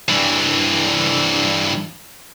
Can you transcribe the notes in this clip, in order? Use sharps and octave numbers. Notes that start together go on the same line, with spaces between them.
G2 E3